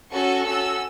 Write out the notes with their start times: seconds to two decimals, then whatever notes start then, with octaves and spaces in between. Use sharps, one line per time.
0.12 C#4 F#4 A4 C#6
0.45 C#4 F#4 A4 E6